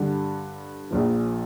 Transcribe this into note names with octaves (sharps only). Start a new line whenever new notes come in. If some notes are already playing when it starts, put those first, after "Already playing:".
Already playing: G2 D3 G3 D4
A#1 A#2 F3